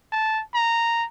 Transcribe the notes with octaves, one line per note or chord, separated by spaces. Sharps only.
A5
A#5